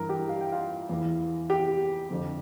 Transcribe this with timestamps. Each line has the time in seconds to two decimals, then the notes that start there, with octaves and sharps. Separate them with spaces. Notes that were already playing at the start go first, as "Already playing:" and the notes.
Already playing: G2 E3 A#4 A#5
0.09 G4 G5
0.29 F5
0.41 G5
0.52 F4 F5
0.89 E2 E3
1.50 G4 G5
2.10 F2 D3 F3